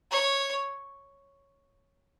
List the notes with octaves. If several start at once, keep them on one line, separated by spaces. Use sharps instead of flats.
C#5